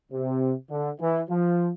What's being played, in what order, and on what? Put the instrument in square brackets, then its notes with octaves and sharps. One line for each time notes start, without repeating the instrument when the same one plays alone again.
[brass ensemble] C3
D3
E3
F3